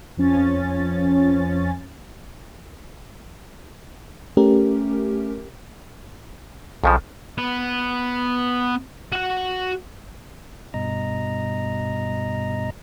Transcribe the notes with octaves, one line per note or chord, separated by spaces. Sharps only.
F2 F3 C#4 A6
A3 C#4 G4 A#4
B1 F2 C#3 F3
B3
F#4 F#5
G2 B2 D#5 A#5